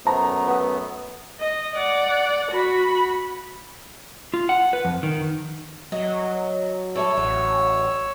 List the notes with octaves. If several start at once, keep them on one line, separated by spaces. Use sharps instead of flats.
F#2 A3 B3 C5 A#5
B4 F#5 D#6
D#5
D5 F#5
F#4 B5
F4
F#5
B4
F2
D#3
F#3 D#5
G3 A3 A4 C#5 E6
A1 F#3